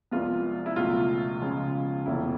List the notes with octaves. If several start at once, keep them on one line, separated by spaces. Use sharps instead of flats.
C2 C3 F3 G#3 B3 F4
E4
C#2 B2 F#3 A3 F4
C#2 C#3 F3 G#3
F1 E2 B2 E4